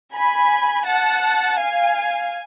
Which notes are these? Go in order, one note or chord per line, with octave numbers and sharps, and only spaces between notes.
G#5 B5
F#5 A5
F5 G#5